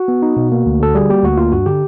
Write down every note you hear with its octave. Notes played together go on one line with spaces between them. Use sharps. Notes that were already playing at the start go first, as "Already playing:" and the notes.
Already playing: F#4
B3
D#4
B2
A#3
D2
D3 A4
G3 G#4
A#3 G4
D2 F#4
A#3 F4
G2 F#4
D3 G4